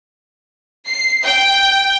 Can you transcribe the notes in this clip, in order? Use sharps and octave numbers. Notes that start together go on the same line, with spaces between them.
C7
G5